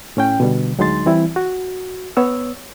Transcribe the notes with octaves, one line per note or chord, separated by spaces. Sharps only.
A2 C#4 G5
B2 D3 G3
D2 F#3 G#3 D#4 C6 A6
E3 G3 C4 E4
F#4
B3 C#5 E6